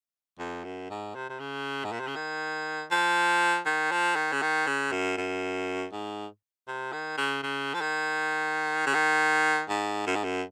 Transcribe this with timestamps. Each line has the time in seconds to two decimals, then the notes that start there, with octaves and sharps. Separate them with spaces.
0.39 F2
0.64 F#2
0.90 G#2
1.15 C3
1.29 C3
1.40 C#3
1.84 G#2
1.92 A#2
2.00 C3
2.07 C#3
2.16 D#3
2.91 F3
3.66 D#3
3.91 F3
4.16 D#3
4.32 C#3
4.42 D#3
4.67 C#3
4.92 F#2
5.17 F#2
5.92 G#2
6.68 C3
6.92 D#3
7.18 C#3
7.43 C#3
7.74 F3
7.81 D#3
8.86 C#3
8.94 D#3
9.69 G#2
10.07 F#2
10.15 G#2
10.24 F#2